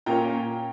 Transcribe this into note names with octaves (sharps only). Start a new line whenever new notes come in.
A#2 A#3 C#4 G5 A#5